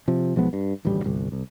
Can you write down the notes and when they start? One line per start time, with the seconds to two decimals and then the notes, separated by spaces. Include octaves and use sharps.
0.08 C3 F3
0.36 B1 F3 G#3 B3
0.53 G2
0.85 D#1 A1 D2 G3
1.04 G1 C2
1.32 C2